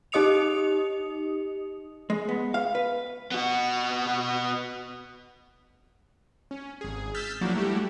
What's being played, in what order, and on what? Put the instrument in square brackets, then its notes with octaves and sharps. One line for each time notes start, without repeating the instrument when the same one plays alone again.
[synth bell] D#4 G4 D#5 D#6 C#7 F7
[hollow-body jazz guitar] G#3
B3
F5
B4
[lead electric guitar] B3 F#4
[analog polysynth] C#4
G#1 G#4
E6 F6 G6 A6 B6
F3 F#3 A#3 D4 E4 F#4
G3 A3 E4 F#4 G4